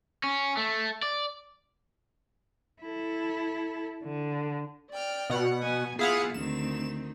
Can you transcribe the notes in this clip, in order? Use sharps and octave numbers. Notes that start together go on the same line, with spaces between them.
C#4
A3
D5
E4 A4
D3
D5 G5 F6
B2 F#5
B3 G#5
B3 E4 F4 G#4 F5 F#5
D2 D#3 C4 E7